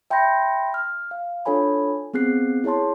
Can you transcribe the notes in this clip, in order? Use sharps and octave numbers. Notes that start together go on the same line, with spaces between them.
E5 G5 B5 C6 G6 A#6
F6
F5
D4 F4 A4 C#5 G#5 B5
B3 C4 G#4 F#6 C7
E4 G#4 C#5 A5 C6